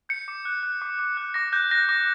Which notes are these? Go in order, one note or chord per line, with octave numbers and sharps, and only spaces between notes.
G6 C#7
D6
F#6
F#6
D6
D6
F#6
D6 A#6
F#6 G6
F#6 A#6
D6 A#6